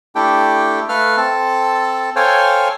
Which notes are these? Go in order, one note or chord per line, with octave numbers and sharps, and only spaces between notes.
A3 D4 E4 G4 A4 G5
A3 A4 B4 F5 F6
C4 A4 A5
A4 C5 C#5 F5 G5 G#5